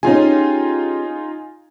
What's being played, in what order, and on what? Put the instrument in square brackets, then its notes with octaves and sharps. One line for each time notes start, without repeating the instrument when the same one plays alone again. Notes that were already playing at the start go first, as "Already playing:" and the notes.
[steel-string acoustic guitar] C#4 G4 G#4 [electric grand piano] D#4 F4 G#5